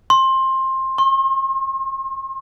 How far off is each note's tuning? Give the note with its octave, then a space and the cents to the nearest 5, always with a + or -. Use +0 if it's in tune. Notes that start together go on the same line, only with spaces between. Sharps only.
C6 +20
C6 +45